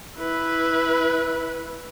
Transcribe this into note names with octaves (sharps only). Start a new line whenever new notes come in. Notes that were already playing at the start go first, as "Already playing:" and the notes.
E4 B4